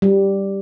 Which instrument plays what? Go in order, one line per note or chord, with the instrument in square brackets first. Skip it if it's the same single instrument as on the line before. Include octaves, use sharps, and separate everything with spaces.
[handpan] G3